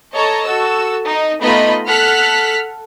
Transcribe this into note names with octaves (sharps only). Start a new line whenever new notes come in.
A4 C#5 D#5 A5 A#5
F#4 A4 E6
D#4
A3 B3 D#4 F4 D#5 B5
A4 F#5 F6 F#6 B6